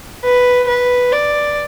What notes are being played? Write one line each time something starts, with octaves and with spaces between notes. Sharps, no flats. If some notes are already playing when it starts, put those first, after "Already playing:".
B4
B4
D5